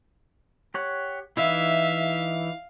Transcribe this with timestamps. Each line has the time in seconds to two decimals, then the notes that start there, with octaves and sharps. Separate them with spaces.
0.74 G4 C#5 F#5
1.37 E3 D#4 E4 E5 F5